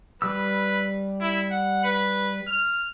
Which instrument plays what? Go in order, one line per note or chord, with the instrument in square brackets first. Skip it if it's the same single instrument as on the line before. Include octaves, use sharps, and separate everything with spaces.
[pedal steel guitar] G3 E6 [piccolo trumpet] B4
[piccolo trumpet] E4
F#5
B4
F6